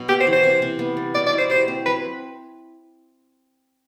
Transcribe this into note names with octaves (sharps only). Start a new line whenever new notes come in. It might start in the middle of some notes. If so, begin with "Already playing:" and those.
Already playing: B2 F#3
B3 G4
C5
E3
C5
C3
C3
B3
G3
B2 D5
D5
E4
C5
G4 C5
C4
F#3 B4